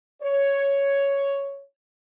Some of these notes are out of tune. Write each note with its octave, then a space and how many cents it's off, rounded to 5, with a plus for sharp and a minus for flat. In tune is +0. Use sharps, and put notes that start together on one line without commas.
C#5 +5